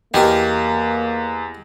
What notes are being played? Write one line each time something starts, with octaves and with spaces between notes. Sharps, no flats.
E2 A#3 D#4 G4 A#4 G5